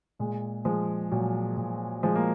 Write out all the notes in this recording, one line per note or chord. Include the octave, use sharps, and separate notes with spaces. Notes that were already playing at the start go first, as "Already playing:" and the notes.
A#2 G#3
F3 G#3
A#2 F#3
A#2
F3 G#3
A#3